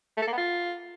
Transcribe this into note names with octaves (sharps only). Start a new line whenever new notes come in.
A3
A4
A#3
B3
F4